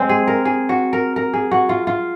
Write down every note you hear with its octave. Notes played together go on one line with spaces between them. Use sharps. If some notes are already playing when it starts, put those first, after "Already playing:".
Already playing: G#3 C4
G#4
A#4
G#4
F#4
A#4
A#4
G#4
F#4
F4
F4